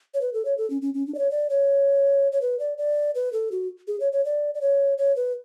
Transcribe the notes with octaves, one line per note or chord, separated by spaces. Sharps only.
C#5
B4
A4
C#5
A4
C#4
C#4
C#4
D4
D5
C#5
D5
C#5
C#5
B4
D5
D5
B4
A4
F#4
G#4
C#5
C#5
D5
D5
C#5
C#5
B4